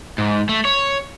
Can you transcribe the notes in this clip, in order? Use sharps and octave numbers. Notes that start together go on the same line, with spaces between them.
G#2
A3
C#5